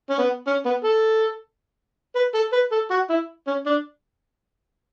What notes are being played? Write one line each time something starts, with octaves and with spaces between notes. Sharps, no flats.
C#4
B3
C#4
B3
A4
B4
A4
B4
A4
F#4
E4
C#4
D4